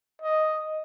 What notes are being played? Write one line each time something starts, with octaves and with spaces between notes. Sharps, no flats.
D#5